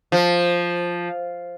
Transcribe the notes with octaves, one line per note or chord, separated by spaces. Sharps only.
F3